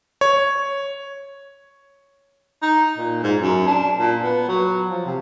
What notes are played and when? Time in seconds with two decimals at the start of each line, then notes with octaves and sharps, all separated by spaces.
0.21 C#5
2.62 D#4
2.98 A#2
3.23 G#2
3.41 F#2
3.67 D4
3.98 A#2
4.23 B3
4.49 F#3
4.90 F3
5.06 C3